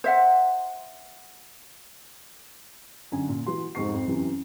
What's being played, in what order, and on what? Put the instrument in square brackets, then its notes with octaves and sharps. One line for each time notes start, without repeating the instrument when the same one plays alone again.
[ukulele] C5 E5 F#5
[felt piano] F#2 D3 G#5
A#2
E3 F#4 C6
F2 G#2 C3 C#6 C7
F2
F#2 C3 E3